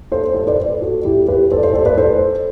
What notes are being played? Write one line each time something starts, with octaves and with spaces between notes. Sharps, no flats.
A4 C5
A4 C5
B4 D5
F#4 A4
E4 G4
G4 B4
A4 C5
D5
A4 C5
A4 C5
B4 D5
A4 C5